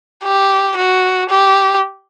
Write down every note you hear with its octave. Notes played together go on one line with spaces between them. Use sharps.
G4
F#4
G4